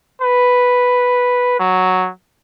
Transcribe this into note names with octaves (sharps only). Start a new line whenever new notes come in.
B4
F#3